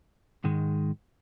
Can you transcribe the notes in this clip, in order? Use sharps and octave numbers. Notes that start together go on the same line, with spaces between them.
G#2 D#3 G#3